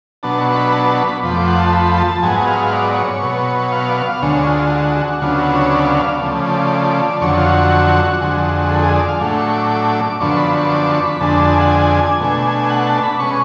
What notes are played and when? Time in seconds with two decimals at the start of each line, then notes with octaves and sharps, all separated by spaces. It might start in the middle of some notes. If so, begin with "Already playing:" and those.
0.23 B2 F#3 B3 D4 A5
0.40 C#6
0.52 C#6
0.56 B5
0.72 A5
0.98 B5
1.23 F2 F3 A3 B5
1.35 D6
1.48 F#5
1.60 A5
1.73 B5
1.98 A5
2.22 G#2 F#3 B3 G#5
2.47 F5
2.72 D5
2.97 C#5
3.22 B2 F#3 B3
3.72 F5
3.89 D5
3.97 F5
4.22 D2 D3 G#3 C#5
4.47 F4
4.72 F#4
4.97 F#4
5.22 D2 C#3 F#3 B3 D4 F4
5.38 F#4
5.55 C#5
5.72 D5
5.84 F5
5.97 F5
6.09 D5
6.22 C#3 F3 A3
6.46 D5
7.21 F2 D3 F#3 C#5
7.37 F4
7.46 F#4
8.21 F2 D3 G#3
8.71 A4
8.83 G#4
8.96 D5
9.08 F5
9.21 A2 F#3 A3 D4
9.37 C#6
9.54 D6
9.70 D6
9.96 D6
10.20 F#2 D3 F3 B3 D4 C#6
10.37 B5
10.54 C#6
10.70 D6
10.87 C#6
11.04 B5
11.20 F2 D3 G#3 D4 A5
11.45 A5
11.53 G#5
11.61 F#5
11.68 G#5
12.20 B2 A3 D4
12.70 F#5
12.87 A5
13.03 B5
13.20 B2 G#3 C#4 C#6